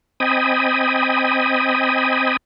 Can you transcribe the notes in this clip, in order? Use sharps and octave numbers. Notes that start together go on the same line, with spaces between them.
C4 D#5 G5 G#5 B5 D#6